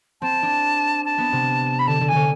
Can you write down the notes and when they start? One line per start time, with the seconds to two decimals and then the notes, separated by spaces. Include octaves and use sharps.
0.22 C4 A5
0.43 D4
1.05 A5
1.18 B3
1.33 C3
1.79 B5
1.87 D3 A5
2.01 D3
2.08 G#5
2.15 D3